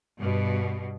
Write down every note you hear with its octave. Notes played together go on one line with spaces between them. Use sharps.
G2 B2